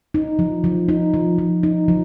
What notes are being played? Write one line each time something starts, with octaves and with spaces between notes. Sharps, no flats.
D#4
F3
F3
D#4
F3
F3
D#4
F3